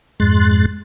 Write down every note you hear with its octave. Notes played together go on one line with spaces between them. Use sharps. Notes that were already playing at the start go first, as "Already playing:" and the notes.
F2 G#2 G#3 C6 F#6 A6